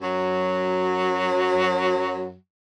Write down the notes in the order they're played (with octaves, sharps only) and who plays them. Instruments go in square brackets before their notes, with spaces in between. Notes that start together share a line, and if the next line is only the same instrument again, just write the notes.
[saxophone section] F#2 F#3